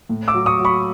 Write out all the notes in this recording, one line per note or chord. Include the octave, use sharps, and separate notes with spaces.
A2
D6 E6
F#3
C#6 D#6
F#3
B5 C#6